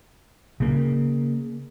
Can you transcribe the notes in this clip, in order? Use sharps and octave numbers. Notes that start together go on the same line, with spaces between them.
C#3 A#3